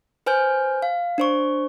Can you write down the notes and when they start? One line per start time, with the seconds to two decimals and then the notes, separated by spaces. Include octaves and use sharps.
0.26 B4 C5 G#5 F6 G6
0.82 F5
1.18 D4 C5 C#6